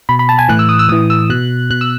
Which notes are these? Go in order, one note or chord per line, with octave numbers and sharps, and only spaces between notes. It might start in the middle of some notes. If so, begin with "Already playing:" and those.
B2 B5
B5
A5
G#5
A2 E3 F#6
E6
D#6
E6
A2 E3 D#6
E6
B2 F#6
B2 F#6
E6